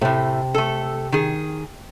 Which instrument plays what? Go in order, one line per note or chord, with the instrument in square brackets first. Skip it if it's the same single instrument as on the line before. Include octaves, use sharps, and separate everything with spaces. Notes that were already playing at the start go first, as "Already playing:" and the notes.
[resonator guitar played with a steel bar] A2 A3 [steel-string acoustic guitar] C3
[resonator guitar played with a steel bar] A3 A4
D#3 G#4